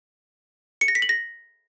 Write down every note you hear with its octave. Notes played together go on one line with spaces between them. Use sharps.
C#7
A#6
B6
F#7
A#6